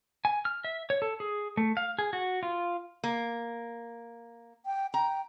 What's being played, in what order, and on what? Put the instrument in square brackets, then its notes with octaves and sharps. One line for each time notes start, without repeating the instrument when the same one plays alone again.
[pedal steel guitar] G#5
F6
E5
C#5
A4
G#4
A3
F5
G#4
F#4
F4
[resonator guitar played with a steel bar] A#3
[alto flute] G5
[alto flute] G5 [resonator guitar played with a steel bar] A#5